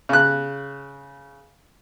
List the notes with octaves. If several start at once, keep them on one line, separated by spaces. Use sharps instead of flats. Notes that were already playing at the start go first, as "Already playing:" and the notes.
C#3 F#6